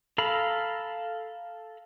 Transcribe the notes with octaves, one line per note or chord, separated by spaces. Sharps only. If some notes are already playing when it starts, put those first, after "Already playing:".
A4 F5 A#5 B5